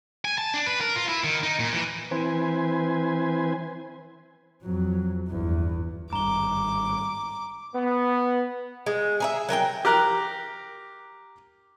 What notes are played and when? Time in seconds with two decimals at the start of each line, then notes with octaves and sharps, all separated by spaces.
0.25 G#5
0.38 A5
0.54 D4
0.67 B4
0.81 A#4
0.96 F4
1.08 E4
1.24 D#3
1.43 D#4
1.59 A#2
1.73 E3
2.11 E3 C4 B4 C5 G#5
4.62 F2 F#3
5.28 G1 E2
6.13 G#1 G2 A#5 D6 G7
7.75 B3
8.86 G#3
9.20 G#4 A#4 E5
9.49 F#3 A#4 B4 G5
9.85 G4 A#4 A#5 F#6